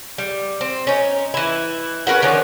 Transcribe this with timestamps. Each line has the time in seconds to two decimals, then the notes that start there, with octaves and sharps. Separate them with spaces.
0.18 G3
0.61 C4
0.87 C#4 D#4
1.34 E3 E4
2.07 C#4 A#4 B4 F#5
2.22 D3 D#3 F3 C#4